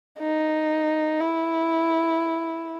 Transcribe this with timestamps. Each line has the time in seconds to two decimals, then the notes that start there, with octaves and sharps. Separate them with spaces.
0.19 D#4
1.20 E4